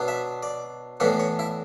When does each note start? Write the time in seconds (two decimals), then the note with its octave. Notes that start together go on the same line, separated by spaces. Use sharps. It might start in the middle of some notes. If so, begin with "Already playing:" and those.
Already playing: B2 F#3 B3 D4
0.08 E5
0.43 D5
1.00 A2 E3 B3 D4 C#5
1.20 C#5
1.39 E4